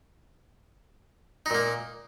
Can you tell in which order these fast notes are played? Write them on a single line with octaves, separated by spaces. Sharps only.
D#4 A#2 A#3